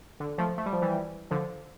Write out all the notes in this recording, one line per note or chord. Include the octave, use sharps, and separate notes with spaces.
D3
F3 A3
A3
G3
F3
E3 G3
D3 F3